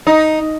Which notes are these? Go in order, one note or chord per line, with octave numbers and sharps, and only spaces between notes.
D#4